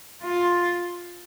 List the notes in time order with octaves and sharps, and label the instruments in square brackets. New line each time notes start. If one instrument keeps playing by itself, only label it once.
[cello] F4